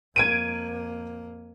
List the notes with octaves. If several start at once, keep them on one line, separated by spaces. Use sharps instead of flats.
F2 A#3 G#6 D7 D#7